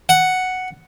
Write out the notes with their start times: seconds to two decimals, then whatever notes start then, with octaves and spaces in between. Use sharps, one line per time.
0.09 F#5